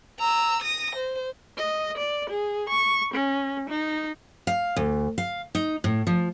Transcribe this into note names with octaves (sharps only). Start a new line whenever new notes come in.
A#5 E6
D#6 A#6
C5
D#5
D5
G#4
C#6
C#4
D#4
F5
D2
F5
D#4
A2
F3